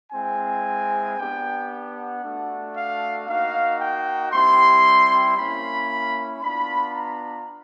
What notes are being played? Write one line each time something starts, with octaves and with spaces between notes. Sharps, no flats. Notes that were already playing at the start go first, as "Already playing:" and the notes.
G#3 C4 E4 G#5
B3 D4 G4 G5
F#5
A3 D4 F#4
F5
A#3 D#4 F#4 F5
G5
G3 C4 E4 G4 C6
A#3 C#4 E4 B5
B3 D4 F4 B5
A#5